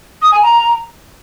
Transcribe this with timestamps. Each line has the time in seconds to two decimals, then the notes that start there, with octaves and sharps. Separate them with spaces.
0.22 D#6
0.32 G#5
0.42 A#5